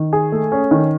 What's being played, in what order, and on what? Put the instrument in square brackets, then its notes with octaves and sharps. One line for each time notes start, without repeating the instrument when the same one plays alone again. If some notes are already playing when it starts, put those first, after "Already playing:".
Already playing: [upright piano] D#3
G#4
A3
C#4
D#3